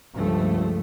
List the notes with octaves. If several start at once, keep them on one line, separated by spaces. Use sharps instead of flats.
C#2 G2 F3 A3